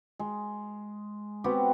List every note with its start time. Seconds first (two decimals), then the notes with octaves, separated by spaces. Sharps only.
0.19 G#3
1.44 B3 C4 F#4 G4